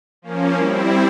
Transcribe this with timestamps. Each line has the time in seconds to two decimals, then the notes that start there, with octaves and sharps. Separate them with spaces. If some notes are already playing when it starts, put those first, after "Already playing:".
0.22 F3 A#3 C#4
0.55 G3 C4 E4